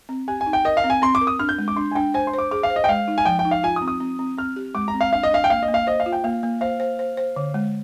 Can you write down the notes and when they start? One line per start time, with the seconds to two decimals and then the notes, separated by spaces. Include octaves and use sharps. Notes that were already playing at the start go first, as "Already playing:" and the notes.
0.09 C4
0.28 G4 G#5
0.41 G#5
0.46 D#4
0.53 G5
0.65 A#4 D#5
0.77 F5
0.84 C4
0.90 G#5
1.02 C4 C6
1.15 D6
1.21 A#4
1.27 D#6
1.39 D4 F6
1.49 G6
1.58 G#3
1.68 D6
1.76 D4 C6
1.91 G#5
1.95 D4 G5
2.14 C5 G#5
2.27 C6
2.33 C5
2.38 D6
2.51 G#4 D6
2.63 F5
2.70 C5
2.76 D#5
2.84 G5
2.89 G#3 F5
3.08 D#4
3.18 G#5
3.25 F3 G5
3.39 G5
3.45 D#4
3.51 F5
3.63 F4 G#5
3.76 D#6
3.82 C4
3.88 D#6
4.00 C4
4.19 C4
4.38 C4 F6
4.56 G4
4.75 G#3 D6
4.88 A#5
4.94 C4
5.01 F5
5.12 D4 F5
5.23 D#5
5.31 D4 F5
5.44 G5
5.50 A#3 F5
5.63 D#5
5.68 A#3
5.74 F5
5.87 C5 D#5
6.00 F5
6.06 F4
6.12 G5
6.24 A#3 F5
6.43 A#3
6.61 C5 F5
6.80 C5
6.99 C5
7.17 C5
7.36 D3
7.54 G#3